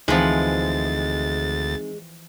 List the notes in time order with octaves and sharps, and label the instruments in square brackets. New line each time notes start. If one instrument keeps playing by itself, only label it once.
[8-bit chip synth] D2 A6 [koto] E3 F3 [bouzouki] G#3 [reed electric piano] C4 D#4